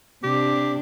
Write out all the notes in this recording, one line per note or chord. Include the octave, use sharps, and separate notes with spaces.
C3 D4 G4